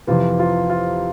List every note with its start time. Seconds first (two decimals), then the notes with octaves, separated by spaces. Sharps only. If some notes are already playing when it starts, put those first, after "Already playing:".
0.07 F2 C3 E3 F4
0.39 F4
0.70 F4